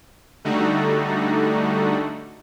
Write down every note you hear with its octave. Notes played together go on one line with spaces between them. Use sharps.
D3 G3 A3 D#4 F#4